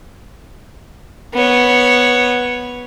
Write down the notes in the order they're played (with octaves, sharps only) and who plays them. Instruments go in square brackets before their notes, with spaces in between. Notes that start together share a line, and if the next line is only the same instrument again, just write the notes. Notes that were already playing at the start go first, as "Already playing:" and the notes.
[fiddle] B3 C#5